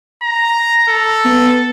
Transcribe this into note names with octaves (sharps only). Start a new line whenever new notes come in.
A#5
A4
B3